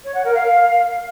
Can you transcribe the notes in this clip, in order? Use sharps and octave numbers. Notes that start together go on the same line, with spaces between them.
C#5
F#5
A#4
F5